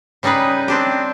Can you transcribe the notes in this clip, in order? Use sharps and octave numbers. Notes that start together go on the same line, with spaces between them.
C#3 G3 D#4 G#4 B4
C4 D4 G4